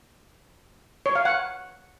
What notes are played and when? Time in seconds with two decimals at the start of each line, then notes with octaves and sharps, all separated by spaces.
1.06 C#5
1.15 F5
1.25 F#5